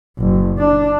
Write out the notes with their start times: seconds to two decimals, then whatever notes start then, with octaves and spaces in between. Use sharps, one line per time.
0.18 F#1
0.58 D4